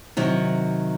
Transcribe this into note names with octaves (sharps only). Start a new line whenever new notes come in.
C3 D#3 F#3